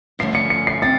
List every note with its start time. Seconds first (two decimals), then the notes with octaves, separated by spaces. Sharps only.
0.19 G2 D3 F3 A3 C#4 C7
0.35 C#7
0.50 C#7
0.67 C7
0.82 C4 A6